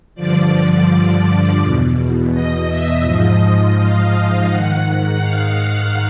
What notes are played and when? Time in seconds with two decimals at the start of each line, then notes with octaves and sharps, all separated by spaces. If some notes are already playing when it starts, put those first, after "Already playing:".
0.15 G2 D3 F3 D5
1.60 E2 B2
2.31 D#5
2.67 E5
3.03 G#2 F3 D#5
3.76 F5
4.47 G#2 D#3 F#5
5.20 F5